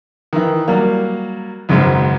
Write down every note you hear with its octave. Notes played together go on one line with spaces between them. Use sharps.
D#3 E3
F#3 G3 A#3
G#1 C#2 F#2 G#3 D#4 C5